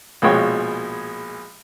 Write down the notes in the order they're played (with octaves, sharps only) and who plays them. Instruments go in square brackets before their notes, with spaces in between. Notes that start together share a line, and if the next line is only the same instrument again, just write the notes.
[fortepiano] A#1 B2 G#3 G#4 C#5 G5